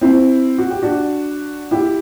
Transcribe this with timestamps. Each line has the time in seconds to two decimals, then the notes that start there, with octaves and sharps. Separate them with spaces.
0.01 C4 E4
0.58 F#4
0.70 G4
0.82 D4 F#4
1.71 E4 G4